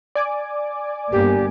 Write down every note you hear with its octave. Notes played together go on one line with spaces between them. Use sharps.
D5 G#5 D6
G1 A#3 G4